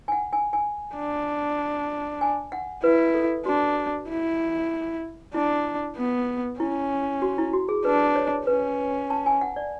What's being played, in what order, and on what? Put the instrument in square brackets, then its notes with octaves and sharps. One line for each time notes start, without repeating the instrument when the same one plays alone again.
[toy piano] G#5
F#5
G#5
G#5
[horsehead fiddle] D4
[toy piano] G#5
F#5
[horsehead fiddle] E4 [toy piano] B4
[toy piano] A4
[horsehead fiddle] D4 [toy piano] F#4
[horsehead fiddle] E4
[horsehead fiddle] D4 [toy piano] E4
[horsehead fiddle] B3
[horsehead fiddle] C#4 [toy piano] E4
[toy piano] F#4
E4
F#4
G#4
[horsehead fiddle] D4 [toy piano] B4
[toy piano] C#5
[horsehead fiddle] C#4 [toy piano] B4
[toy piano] A5
G#5
F#5
D5